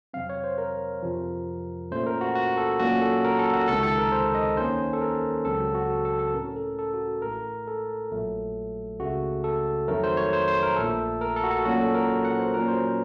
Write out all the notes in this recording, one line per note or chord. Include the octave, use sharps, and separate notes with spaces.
F2 C3 F#3 C4 F5
C#5
C5
A#4
F2 C3 F3
A#2 A3 C#4 C5
A#4
F#4
F#4
A4
A#2 F#3 A#3 C#4 F#4
A4
A#4
A4
F#4
C#2 C3 D#3 A4
A4
A#4
C5
D#5
D#2 D#3 A#3 C#4 C5
A4
A#4
C#2 C#3 F#3 C4 A4
F#4
F#4
A4
A4
A4
A2 A3 C#4 A#4
A4
A4
F#4
A1 A2 A3 A#4
A4
A#1 A#2 F#3 A3
C#2 C#3 A3 F#4
A4
F2 D#3 F#3 A3 A#4
C5
C#5
C5
C5
A#4
A#1 A#2 A3 A4
A#4
A4
F#4
A4
A#2 F#3 A#3 C#4 F#4
A4
A#4
F#5
C5
A#2 F#3 A#3 C#4 A#4
C5